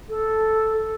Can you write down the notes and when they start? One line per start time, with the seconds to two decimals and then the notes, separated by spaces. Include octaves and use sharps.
0.09 A4